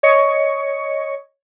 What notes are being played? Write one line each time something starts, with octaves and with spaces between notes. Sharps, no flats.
C#5 D#5 C#6 C#7